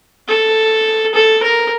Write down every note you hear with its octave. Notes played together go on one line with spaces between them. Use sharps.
A4
A4
A#4